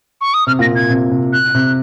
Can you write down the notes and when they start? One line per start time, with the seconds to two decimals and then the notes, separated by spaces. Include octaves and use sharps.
0.21 C#6
0.34 D#6
0.47 C3 F6
0.59 A#2 A#6
0.71 C3
0.75 G#6
0.90 C3
1.11 C3
1.33 F#6
1.55 C3